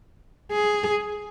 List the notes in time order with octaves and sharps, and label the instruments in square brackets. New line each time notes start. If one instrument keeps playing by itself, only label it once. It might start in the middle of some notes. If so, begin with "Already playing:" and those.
[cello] G#4